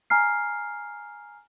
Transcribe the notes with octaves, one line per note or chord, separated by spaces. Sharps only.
G#5 A#5 F6 C7